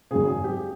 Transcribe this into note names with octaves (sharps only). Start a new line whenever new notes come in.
G#1 F#2 C#3 G#4
G#4
G4